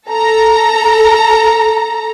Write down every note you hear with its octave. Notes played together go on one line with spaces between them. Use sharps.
A4 A#5